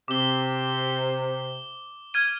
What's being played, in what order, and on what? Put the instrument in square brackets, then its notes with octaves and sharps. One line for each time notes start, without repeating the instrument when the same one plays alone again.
[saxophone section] C3 [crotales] D6 G7
[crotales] F6 G#6 D#7